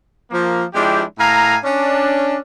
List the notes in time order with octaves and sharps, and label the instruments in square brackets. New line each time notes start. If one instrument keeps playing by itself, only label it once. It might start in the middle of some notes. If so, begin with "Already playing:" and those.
[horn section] F3 A#3
F3 G#3 D4 E4 G4
A2 F5 G#5 A#5
C#4 D4